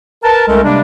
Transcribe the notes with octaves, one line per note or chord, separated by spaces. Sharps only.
A#4 B4 A5
C2 G#3 A3 C#4 A4 A#4
C3 G3 G#3 A#3 D4